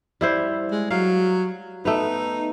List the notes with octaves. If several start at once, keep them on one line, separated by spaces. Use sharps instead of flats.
G3 E4 C5
G#3
F#3 F5
A3 B3 D#4